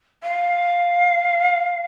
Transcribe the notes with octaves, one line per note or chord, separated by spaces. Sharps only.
F5